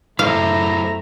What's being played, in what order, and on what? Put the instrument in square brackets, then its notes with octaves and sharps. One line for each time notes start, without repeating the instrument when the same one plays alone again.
[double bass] F#2 A3 [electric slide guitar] E4 A4 C5 [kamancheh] E5 A#5 [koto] F5